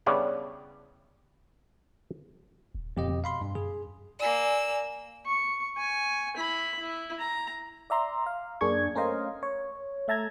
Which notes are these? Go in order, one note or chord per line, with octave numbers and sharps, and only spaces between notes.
C#3 G3 B3 C#4 D4 E4
D#1
F2 A#2 G4 D#5
B2
F5 B5 C6
G2
F#2 G#4
A#3 D5 G#5 E6
C#6
G#5 C#6
E4 B5
E4
A#5
D5 E5 A#5 C6
F5
F#2 A#3 D4 G#4 C#6 G#6
A3 C#4 A#4 C5 D#5 F5
C#5
A3 E5 A5 A#5 G#6